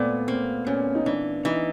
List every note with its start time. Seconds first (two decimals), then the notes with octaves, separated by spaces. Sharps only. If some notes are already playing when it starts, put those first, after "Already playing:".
Already playing: A#2 A3 B3 C4
0.27 A#3 C4
0.67 A#2 C#4
0.95 D#4
1.06 E3 D4
1.45 E3 D#4